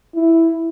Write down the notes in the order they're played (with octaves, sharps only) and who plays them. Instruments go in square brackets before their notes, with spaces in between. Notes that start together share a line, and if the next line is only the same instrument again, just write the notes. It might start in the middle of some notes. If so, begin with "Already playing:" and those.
[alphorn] E4